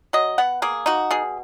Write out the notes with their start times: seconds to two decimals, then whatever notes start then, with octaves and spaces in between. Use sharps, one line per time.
0.13 F#3 D#5
0.38 B3 F#5
0.62 A#3 G#4
0.86 D#4 F#4
1.11 B2 G#4